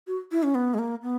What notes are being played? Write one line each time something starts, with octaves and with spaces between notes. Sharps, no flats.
F#4
E4
C#4
B3
G#3
A#3
B3